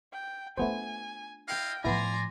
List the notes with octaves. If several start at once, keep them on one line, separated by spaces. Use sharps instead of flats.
G5
A3 B3 D4 F4 C5 G#5
E4 D#5 F5 G5
A2 F3 B3 E4 D5 G#5 A#5 C6